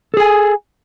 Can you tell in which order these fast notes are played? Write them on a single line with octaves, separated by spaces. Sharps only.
A4 G#4 G#5